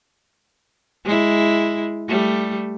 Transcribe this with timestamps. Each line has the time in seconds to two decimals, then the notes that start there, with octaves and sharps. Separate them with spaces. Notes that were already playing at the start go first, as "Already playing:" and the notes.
1.05 G#3 E4
2.08 G3 A3